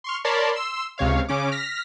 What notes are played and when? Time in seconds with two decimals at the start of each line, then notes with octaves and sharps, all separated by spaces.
0.04 C6 C#6 F6
0.24 A#4 C#5 D5 A5 B5 C6
0.53 C6 E6
0.98 C#2 C3 C#5 F5
1.28 C#3 C#4 D6
1.52 F6 A#6 B6